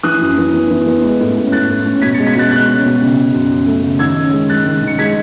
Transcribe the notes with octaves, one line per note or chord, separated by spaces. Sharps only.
E3 D#6 F#6
F#2
E3
B3
E3
B3
G#3
A2
C#4
A2 F#6 A6
A2
C#4
B2 G#6 B6
G#3 A6 C#7
G#6 B6
B2 F#6 A6
G#3 F#6 A6
C#4
B2
C#3
C#3
F#2
F#2
A3
C#3
D#3 E6 G#6
C#4
G#3
G#3 F#6 A6
D#3
D#3 C#7
G#3 G#6 B6